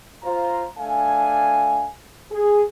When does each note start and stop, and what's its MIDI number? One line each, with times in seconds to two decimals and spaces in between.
0.23 0.64 65
0.23 0.64 72
0.23 0.64 82
0.78 1.86 57
0.78 1.86 62
0.78 1.86 77
0.78 1.86 80
2.31 2.62 68